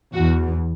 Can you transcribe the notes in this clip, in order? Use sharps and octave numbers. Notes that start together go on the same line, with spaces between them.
E2 E3 F#4